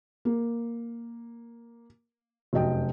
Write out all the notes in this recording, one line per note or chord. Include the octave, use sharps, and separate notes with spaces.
A#3
F1 F#2 D#5 G5